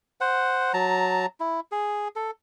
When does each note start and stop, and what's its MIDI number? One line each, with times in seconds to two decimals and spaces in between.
0.21 0.73 72
0.21 0.73 78
0.74 1.26 54
0.74 1.26 81
0.74 1.26 82
1.40 1.60 64
1.72 2.08 68
2.16 2.31 69